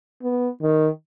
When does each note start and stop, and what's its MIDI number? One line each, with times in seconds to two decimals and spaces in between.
0.23 0.48 59
0.62 0.88 51